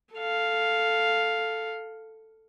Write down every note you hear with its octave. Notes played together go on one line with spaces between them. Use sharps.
A4 F5